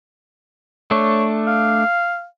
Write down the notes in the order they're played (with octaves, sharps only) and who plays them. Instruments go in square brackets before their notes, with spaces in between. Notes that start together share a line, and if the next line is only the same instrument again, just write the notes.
[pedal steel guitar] A3 D4 [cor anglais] C#5
[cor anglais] F5